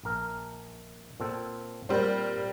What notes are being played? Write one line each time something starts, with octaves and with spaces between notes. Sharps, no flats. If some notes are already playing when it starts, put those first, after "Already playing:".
A#1 A#4
A#2 C4 A4
A#2 G3 C4 A#4 C5